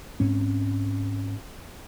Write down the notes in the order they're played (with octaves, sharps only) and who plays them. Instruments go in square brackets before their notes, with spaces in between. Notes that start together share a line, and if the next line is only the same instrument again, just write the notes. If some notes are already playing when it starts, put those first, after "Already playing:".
[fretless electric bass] G#2 C4 C#4